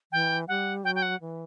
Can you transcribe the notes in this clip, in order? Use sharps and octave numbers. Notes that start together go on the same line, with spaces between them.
E3 G5
G3 F#5
F#3 G5
G5
F#5
E3